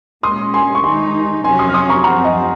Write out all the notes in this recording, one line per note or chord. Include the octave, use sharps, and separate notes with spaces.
A#2 G#3 C#4 C6 D#6
G#5 C6
C#6
D#3 G#3 D#4 G#5 C6
F2 C3 F#3 C#4 F#4 G#5 C6
C6 D#6
F6
C6 D#6
A#5 C#6
F#2 F3 C4 F#5 A#5
D#5 F#5